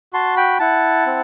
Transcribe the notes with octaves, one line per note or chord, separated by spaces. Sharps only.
F#4 A5 C6
G5 B5
E4 F#5 A5
C4